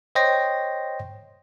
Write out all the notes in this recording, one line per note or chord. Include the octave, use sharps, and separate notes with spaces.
C5 C#5 D#5 G5 C6 A#6